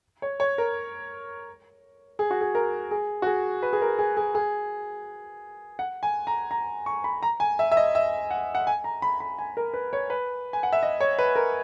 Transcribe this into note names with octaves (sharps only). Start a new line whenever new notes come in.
C#5
C#5
A#4
G#4
F#4
G#4
A#4
G#4
F#4
G#4
B4
G#4
A#4
G#4
G#4
G#4
F#5
G#5
A#5
A#5
C#6
B5
A#5
G#5
E5
E5
D#5
E5
F#5
F#5
G#5
A#5
B5
B5
G#5
A#4
B4
C#5
B4
G#5
F#5
E5
D#5
C#5
B4
A#4